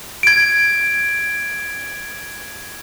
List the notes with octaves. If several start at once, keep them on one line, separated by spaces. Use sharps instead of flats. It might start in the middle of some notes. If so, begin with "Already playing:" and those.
G#6 D7